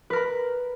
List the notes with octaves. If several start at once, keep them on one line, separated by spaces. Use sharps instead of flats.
A#4 B4 B5